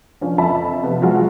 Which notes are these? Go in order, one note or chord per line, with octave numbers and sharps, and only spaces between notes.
F3 C#4 D4
F2 E5 A5 B5
C3 F3 B3
F#3 G#3 F4 F#4